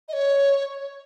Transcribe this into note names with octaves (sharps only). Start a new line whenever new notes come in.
D#5
C#5